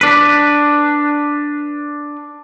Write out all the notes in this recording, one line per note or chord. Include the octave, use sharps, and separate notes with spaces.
D4 B4